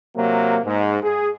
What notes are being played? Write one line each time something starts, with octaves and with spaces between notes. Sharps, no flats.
C3 F#3 A#3
G#2
G#4